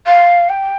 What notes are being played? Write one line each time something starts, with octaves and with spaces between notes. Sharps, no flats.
F5
G5